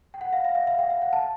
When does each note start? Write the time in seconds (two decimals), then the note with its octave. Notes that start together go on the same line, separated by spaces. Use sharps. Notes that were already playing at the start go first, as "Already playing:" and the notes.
0.14 G5
0.21 F#5
0.33 F5
0.45 F5
0.55 E5
0.67 F5
0.79 G5
0.90 F5
1.02 F#5
1.13 A5